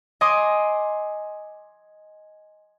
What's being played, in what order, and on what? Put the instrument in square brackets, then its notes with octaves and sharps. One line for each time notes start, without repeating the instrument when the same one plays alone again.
[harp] D#5 G#5 C6 D6 D#6